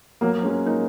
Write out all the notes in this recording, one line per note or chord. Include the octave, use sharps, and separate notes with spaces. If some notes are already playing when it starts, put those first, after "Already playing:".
F#3 A#3
G#3 C#4
A#3 D#4